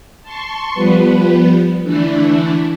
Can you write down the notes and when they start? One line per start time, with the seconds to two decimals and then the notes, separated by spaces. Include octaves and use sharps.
0.22 A5 C6 C#6
0.74 F3 G3 B3 B4
1.82 D3 E3 A3 D4 E4